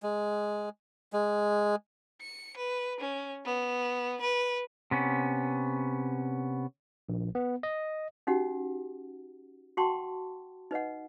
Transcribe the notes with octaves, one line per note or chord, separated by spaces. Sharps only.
G#3
G#3
C#7
B4
C#4
B3
B4
C3 B3 C#4
A#1
B3
D#5
C#4 D#4 F#4 G4 F#5
F#4 F#5 G5 A5 C6 C#6
D#4 B4 D#5 F#5